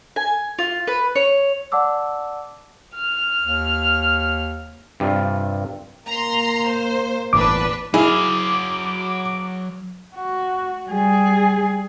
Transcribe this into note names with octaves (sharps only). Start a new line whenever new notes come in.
G#5
F4
B4
C#5
D5 F#5 A5 D6 E6
F6
D#2
G2 C3 F4
A#3 A#5 C6
C5
G1 E2 A2 D4 B4 D6
F#3 E4 G#4 F5 D6
F#4
G3 G#4